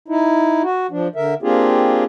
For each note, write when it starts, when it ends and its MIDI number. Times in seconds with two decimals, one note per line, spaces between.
0.08 0.62 63
0.08 0.62 64
0.62 0.87 66
0.91 1.08 53
0.91 1.08 62
1.16 1.34 50
1.16 1.34 70
1.16 1.34 76
1.42 2.04 58
1.42 2.04 60
1.42 2.04 62
1.42 2.04 65
1.42 2.04 67
1.42 2.04 68